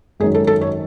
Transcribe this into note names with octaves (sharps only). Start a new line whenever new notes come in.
G#1 F#2 D#3 G#4
A4
A4
C#5